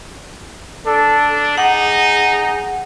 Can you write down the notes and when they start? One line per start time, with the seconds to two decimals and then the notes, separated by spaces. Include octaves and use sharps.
0.86 D4 A4
1.57 D#4 G#4 F#5